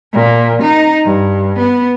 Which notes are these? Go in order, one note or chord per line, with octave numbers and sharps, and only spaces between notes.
A#2
D#4
G2
B3